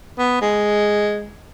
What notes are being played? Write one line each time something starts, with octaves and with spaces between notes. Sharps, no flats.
B3
G#3